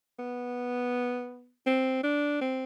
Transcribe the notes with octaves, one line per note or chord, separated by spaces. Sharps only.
B3
C4
D4
C4